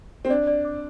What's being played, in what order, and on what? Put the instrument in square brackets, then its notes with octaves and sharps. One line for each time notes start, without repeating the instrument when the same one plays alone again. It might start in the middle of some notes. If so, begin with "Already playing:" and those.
[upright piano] C4
[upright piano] D4 [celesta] D5
[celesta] D5
D6